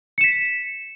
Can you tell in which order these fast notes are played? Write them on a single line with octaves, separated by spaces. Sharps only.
C#7 E7 B6